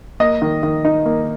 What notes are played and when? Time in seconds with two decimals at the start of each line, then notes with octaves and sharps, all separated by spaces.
0.20 A#3 D#5
0.42 D#3
0.63 D#3
0.85 D#4
1.06 A#3